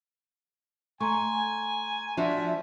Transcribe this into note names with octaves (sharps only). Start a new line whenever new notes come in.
A3 G#5 A#5 C6 C#6
F3 D4 F#4 E5